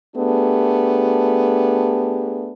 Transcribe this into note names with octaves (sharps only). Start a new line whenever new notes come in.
A3 B3 D4 G4 G#4